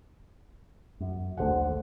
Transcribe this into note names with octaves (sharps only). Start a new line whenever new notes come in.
F#2
A#1 D#2 D3 A3 C5 F#5